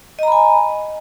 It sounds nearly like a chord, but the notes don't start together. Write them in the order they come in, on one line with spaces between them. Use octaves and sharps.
D#5 A#5 B5 G#5